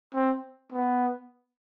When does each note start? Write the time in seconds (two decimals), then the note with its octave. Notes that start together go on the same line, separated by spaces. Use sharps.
0.14 C4
0.72 B3